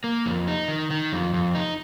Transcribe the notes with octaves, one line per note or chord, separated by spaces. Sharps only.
A#3
F2
D#4
D#3
D#3
F2
F2
D#4